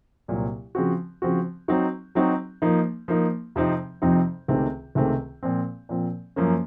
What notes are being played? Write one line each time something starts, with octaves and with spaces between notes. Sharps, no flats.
C2 A#2 F#3
C#3 F3 C4 F#4
C#3 F3 C4 F#4
F#3 C4 D#4 F#4
F#3 C4 D#4 F#4
F3 A#3 D#4
F3 A#3 D#4
F2 C3 F3 C4 D#4
F2 C3 F3 C4 D#4
C#2 C3 D#3 A3 C4
C#2 C3 D#3 A3 C4
A#2 F3 C4
A#2 F3 C4
F#2 F3 A#3 C#4